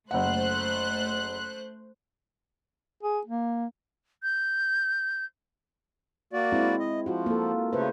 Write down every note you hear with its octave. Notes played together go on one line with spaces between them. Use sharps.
F#1 A3 C5 F#5 F#6
G#4
A#3
G6
A#3 F#4 D5
G#3 C4 E4
D#5
F3 F4 F#4
A#3 A4
C#3 A3 B4 C5